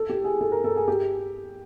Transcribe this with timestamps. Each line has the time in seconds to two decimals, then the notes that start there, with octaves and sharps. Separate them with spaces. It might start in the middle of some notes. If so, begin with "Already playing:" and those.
Already playing: A4
0.10 G4
0.24 G#4
0.41 A4
0.52 A#4
0.64 A4
0.76 G#4
0.88 G4